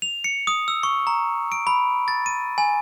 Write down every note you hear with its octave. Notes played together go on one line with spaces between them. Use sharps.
F7
C#7
D#6
E6
C#6
A#5
D7
B5
A6
D#7
G#5